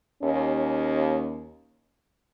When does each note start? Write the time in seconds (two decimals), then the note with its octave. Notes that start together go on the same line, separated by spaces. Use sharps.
0.23 D#2 C#4